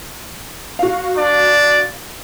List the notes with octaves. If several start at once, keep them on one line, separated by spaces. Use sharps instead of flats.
F#4 F5
D4 D5